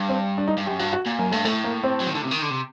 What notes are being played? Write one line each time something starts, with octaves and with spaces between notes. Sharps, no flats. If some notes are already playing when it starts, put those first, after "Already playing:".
Already playing: G2
C4
D4
D#4
G2
F#2 G4
G2 F#4
F#4
A#2
F#2 A#3
G2 A3
A2 A3
A#3
C4
F#3
D#3
D3
C3
D#3
D3
C3